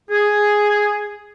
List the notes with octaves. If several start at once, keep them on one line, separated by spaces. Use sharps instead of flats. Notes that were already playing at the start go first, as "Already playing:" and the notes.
G#4